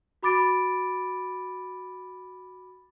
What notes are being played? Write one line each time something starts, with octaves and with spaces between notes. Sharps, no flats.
F#4 B5 D6 A6 D7